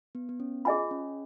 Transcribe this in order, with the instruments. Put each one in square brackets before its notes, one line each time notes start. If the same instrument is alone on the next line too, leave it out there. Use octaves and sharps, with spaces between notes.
[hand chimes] B3
B3
C#4
[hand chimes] F4 [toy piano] G#4 D#5 G#5 B5
[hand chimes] C#4